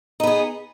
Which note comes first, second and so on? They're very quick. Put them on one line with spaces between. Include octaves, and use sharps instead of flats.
D#4 B3 G#4